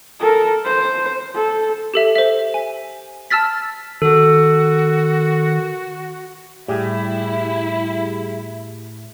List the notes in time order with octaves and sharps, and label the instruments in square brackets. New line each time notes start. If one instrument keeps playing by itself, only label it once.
[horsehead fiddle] A4 A#4
C5
A4
[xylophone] G4 A4 E5
C5 E5
G#5
A5 E6 F6 A6 B6
[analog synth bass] D#3 [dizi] F#4 [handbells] A4
[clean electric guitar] A2 [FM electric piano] G3 G4 G#4 [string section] E4